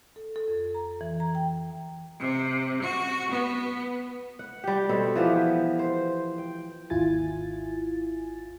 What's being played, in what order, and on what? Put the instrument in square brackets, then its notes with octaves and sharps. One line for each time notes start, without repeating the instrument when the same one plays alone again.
[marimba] A4
A4
F2
A#5
E3
A#5
G5
[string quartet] C3
F#4
B3
[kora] F#5
G3 G4
B2 C4 A4 C#5
E3 F3 B3 G4
C5
G5
[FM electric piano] G#1 D#2 E4 F4 G#5 A6